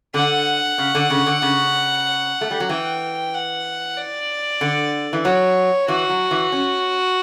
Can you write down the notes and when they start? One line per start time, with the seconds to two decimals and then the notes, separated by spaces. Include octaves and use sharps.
0.14 D3 F#5
0.78 C#3
0.95 D3
1.10 C#3
1.26 D3
1.42 C#3
2.41 A3
2.51 G3
2.60 F#3
2.69 E3 G5
3.34 F#5
3.97 D5
4.61 D3
5.13 E3
5.25 F#3 C#5
5.88 E3 F#4
6.09 F#3
6.31 E3
6.52 C#4